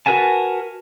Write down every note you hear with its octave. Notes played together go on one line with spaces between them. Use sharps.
F#4 A#4 B4 G#5 A5